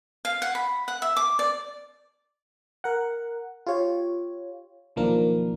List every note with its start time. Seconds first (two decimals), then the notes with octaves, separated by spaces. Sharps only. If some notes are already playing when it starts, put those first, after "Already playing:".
0.25 F5
0.42 F#5
0.55 B5
0.88 F#5
1.02 E5
1.16 D6
1.39 D5
2.84 A#4 F#5
3.66 F4 G4 C#5
4.96 B1 D#3 F3 A#3 D4 A#4